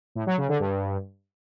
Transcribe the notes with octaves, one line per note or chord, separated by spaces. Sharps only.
A2
F#3
C#3
D3
G2